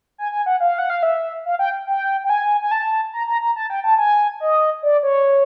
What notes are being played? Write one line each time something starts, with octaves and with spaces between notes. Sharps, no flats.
G#5
G#5
F#5
F5
F#5
F5
E5
F5
G5
G5
G5
G#5
G#5
A5
A#5
A#5
A#5
A5
G5
A5
G#5
D#5
D5
C#5